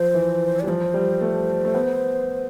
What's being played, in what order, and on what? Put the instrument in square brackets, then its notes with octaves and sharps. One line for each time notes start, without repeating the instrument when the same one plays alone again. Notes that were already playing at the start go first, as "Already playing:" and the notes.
Already playing: [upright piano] F3 [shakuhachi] C5
[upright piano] E3
[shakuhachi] D5
[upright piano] G3
[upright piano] F3 [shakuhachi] C5
[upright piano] G3
A3
A3
B3